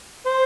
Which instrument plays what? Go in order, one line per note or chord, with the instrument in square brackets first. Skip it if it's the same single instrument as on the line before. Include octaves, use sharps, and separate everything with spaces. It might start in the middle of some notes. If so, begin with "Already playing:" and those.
[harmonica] C5